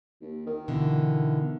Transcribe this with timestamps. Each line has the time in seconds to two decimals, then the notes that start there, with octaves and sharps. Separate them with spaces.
0.21 D#2
0.47 D#3
0.68 B2 D3 E3